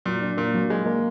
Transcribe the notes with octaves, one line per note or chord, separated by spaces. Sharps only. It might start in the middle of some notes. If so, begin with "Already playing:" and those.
A#2 F#3
D4
A#2 A#3
F#3
G#3 G#4
A#3